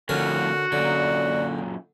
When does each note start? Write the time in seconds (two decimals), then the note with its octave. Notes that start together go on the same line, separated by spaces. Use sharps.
0.09 F2 A2 D3 C#4 F#4 A#4
0.72 F#2 A#2 D3 D5